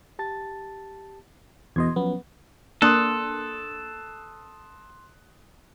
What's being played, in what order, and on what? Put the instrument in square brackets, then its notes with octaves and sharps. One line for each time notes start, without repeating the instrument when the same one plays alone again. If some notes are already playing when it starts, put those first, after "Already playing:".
[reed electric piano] G4 A5 A6
[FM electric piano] E2 B2 D#5 [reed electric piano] C6 G#6
[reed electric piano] F3 F#3 C#4 [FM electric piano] B3
[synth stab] A#3 D4 [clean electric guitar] A4 [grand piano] C6 D#6 F#6